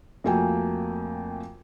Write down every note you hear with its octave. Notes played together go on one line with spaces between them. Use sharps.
F2 A3 A#3 F#4 G5 G#5